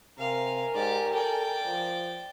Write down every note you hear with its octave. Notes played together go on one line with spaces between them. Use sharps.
C3 A#4 F5 G#5
G#2 G4 D5
A4 D5 G5
F3